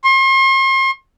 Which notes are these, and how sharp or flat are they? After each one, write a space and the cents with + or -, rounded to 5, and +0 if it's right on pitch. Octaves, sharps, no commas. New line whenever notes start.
C6 +40